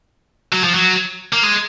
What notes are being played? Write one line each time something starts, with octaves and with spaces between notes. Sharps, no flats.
F#3
F3
F#3
A#3
G#3